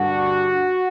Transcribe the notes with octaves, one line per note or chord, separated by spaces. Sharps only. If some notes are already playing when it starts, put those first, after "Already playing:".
Already playing: G2 D3 G3 D4 F#4